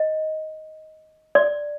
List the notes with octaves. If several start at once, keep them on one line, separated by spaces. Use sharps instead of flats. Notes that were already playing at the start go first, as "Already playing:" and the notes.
Already playing: D#5
D5